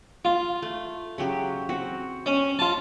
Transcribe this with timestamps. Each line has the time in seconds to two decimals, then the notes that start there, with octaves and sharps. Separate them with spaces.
0.25 F4
0.62 A3
1.18 C#3 F#3 G4
1.69 C4 F#4
2.26 C#4
2.59 F4 A5